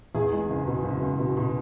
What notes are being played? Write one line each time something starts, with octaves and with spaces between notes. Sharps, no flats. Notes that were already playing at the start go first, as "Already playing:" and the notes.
E2 G#4
G#3
F#1
B2
F#1
F#1
B2
B2